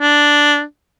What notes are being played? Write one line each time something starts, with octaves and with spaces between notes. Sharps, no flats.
D4